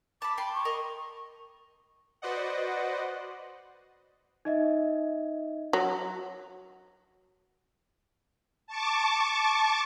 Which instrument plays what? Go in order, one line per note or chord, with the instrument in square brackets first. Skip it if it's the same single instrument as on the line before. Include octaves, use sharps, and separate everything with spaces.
[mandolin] A5 B5 [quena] D6
[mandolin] G5 A5 C6 [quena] B5
[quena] C#6
[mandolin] A#4 D#5
[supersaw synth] F#4 B4 C5 D5 D#5 F#5
[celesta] D#4 D#5 E5
[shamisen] F#3
[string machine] A5 C#6 D6